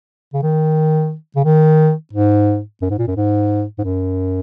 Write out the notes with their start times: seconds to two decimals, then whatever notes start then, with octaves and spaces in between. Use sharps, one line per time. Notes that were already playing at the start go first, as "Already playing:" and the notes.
0.34 C#3
0.43 D#3
1.36 C#3
1.45 D#3
2.13 G#2
2.82 F#2
2.90 G#2
2.99 A#2
3.07 F#2
3.16 G#2
3.78 G#2
3.84 F#2